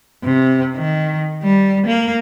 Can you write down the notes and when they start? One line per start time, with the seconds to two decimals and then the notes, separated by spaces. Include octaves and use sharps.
0.24 C3
0.76 D#3
1.43 G3
1.87 A#3